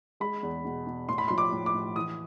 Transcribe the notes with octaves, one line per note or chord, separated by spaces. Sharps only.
G#3 B5
E2
B2
B2
A2 C6
B5
F3 C6
D6
A2
D6
A2
E3 D#6